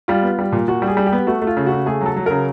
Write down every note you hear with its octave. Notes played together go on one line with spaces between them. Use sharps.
G3 F4
B3
G3
A#2
A#2 F#4
G3
G#4
G3
G4
B3
A3 F#4
A3
F4
C#3
F#4
C#3
A3 G#4
F#3
A4
F#3
C#3 A#4